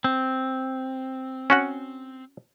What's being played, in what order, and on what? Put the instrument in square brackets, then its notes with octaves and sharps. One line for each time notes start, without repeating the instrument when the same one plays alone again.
[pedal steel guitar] C4
[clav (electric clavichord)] C#4 F#4 F#5